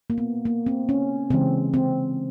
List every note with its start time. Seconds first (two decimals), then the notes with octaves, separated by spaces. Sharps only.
0.10 A#3
0.18 B3
0.45 A#3
0.66 C4
0.89 C#4
1.30 C#3 E3 G#3 C4
1.74 C4